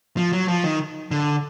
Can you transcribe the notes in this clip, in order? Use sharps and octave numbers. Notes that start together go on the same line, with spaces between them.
F3
F#3
F3
D#3
D3